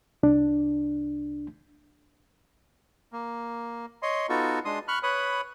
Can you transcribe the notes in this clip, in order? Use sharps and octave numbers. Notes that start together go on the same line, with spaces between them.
C2 D4
A#3
C#5 D#5 C6
B3 D#4 F4 F#4 A4 C#6
G#3 D4 C6 D#6
B5 C#6 F6 F#6
B4 C#5 B5 D#6